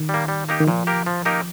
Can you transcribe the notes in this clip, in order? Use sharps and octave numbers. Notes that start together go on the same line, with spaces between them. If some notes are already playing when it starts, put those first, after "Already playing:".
Already playing: D#3
G3 A#3
G3
A#3 D#4 G4
D#3
A#2 F3
A#3 G4 A#4
F3
A#3 D#4 G4 A#4